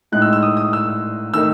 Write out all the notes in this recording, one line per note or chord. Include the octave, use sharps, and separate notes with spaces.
A2 G#3 D#4 F#6
E6
E6
D#6
D#6
E6
D#3 A3 D#4 E6